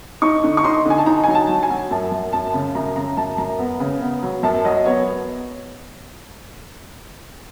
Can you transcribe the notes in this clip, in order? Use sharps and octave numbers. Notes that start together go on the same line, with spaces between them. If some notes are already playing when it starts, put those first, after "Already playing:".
D#4 C#6
D3
C#6
D#4 C6
D3 G#5
A5
D#4 A#5
F#3 G#5
A5
F#3
G#5
F#3
F#2 A5
F#2
F#2 A5
C#3
F#2 A#5
C#3 A#5
F#2 A5
F#2 A#5
B3
C#3
B3
F#3
F#2 A5
F#3 D#5
B3 C#5